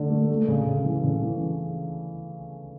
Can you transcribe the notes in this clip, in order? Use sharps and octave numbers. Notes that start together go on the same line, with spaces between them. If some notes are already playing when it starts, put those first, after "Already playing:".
Already playing: D3 A3 D4
A3
A3
C#3
C#3
E3
C#3
E3